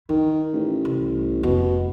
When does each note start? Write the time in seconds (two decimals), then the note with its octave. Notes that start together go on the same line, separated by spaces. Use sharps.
0.09 D#3 E4
0.54 A1
0.85 C2
1.43 F1 B2